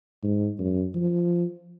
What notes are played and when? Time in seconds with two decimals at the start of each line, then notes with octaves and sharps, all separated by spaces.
0.23 G#2
0.59 F#2
0.95 F3